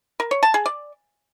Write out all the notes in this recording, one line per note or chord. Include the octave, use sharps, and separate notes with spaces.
A#4
C#5
A5
G#4
D5